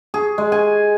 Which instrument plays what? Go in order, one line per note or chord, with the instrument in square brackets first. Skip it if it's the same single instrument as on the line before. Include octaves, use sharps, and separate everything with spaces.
[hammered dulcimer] G#4
G#3
G#5